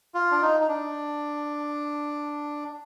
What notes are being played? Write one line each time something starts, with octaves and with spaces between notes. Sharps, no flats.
F4
D4
D#4
D#4
D4